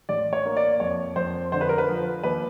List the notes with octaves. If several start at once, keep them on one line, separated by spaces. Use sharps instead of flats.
A1 D5
C#5
A#3
D5
F2 C#5
F2 C5
D3 C5
B4
A#4
B4
F3
D#2 B4